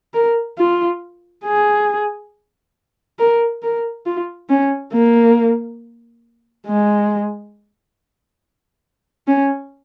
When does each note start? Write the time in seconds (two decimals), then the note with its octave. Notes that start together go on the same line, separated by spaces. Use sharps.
0.14 A#4
0.58 F4
1.45 G#4
3.19 A#4
3.62 A#4
4.06 F4
4.49 C#4
4.93 A#3
6.67 G#3
9.28 C#4